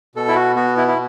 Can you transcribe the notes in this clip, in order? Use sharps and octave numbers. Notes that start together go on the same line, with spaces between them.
B2 A4
E4
F#4
B3 F#4
E4
E4